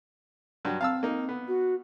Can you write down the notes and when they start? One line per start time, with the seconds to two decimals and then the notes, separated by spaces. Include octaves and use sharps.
0.65 G2 F#3
0.81 C4 F5 A5 E6
1.03 A#3 D#4
1.29 B3
1.48 F#4